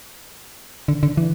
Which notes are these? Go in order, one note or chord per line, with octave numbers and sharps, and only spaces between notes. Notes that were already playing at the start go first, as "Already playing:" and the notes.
D3
D3
E3